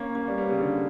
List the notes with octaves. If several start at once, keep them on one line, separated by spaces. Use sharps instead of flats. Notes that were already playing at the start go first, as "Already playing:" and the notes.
Already playing: A#3 C#4
A#3 C#4
G3 B3
G3 B3
C#3
D3